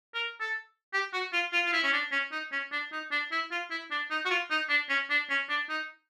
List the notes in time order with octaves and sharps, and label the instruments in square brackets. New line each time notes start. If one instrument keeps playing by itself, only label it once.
[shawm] A#4
A4
G4
F#4
F4
F4
F4
E4
C#4
D4
C#4
D#4
C#4
D4
D#4
D4
E4
F4
E4
D4
D#4
F#4
F4
D#4
D4
C#4
D4
C#4
D4
D#4